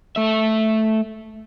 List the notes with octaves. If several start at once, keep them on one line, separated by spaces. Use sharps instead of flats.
A3 E5